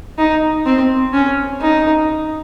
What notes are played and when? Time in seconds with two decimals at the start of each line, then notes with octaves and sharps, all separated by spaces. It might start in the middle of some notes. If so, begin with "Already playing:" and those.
0.18 D#4
0.66 C4
1.13 C#4
1.61 D#4